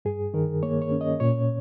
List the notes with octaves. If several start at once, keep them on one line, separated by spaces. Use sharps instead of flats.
G2 G#4
D#3 A#4
A#3 C#5
C#5
C#4
D#5
A#2 C#5